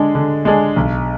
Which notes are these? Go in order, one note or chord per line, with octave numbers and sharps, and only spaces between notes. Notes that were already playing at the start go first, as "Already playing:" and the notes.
Already playing: D3 G#3 D4 G#4
D3
G#3 D4 G#4
B1